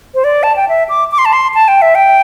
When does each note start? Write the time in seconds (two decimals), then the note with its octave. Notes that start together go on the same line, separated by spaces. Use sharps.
0.15 C5
0.24 D5
0.43 A5
0.56 G5
0.69 E5
0.89 D6
1.11 D6
1.18 C6
1.25 A5
1.33 C6
1.54 A5
1.68 G5
1.82 E5
1.95 G5